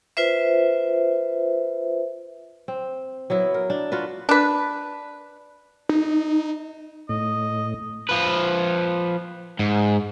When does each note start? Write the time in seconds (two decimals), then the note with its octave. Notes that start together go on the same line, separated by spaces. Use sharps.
0.17 F4 B4 C5 E5
2.68 C4
3.30 F#3 B3 E4
3.54 A#4
3.70 D4
3.92 F4 F#4 B4
4.29 D4 B4
5.89 D#4
7.09 A2 D#5
8.09 F3 B4
9.59 G#2